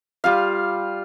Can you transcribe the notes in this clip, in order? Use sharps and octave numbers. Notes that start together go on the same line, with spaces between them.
G3 F4 F5